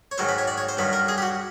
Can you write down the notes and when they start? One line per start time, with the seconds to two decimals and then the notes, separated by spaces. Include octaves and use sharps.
0.11 C#5
0.18 G#2 D#3 F#3 C5
0.29 B4
0.38 C#5
0.47 D5
0.58 C#5
0.69 C5
0.77 G2 D#3 F#3 B4
0.93 A#4
1.08 G#4
1.18 G4
1.22 F#4